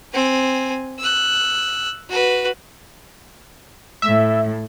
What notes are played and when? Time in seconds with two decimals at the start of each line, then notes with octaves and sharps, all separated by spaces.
0.13 C4 G#5
0.99 E6 F#6
2.09 F#4 B4
4.02 A2 E5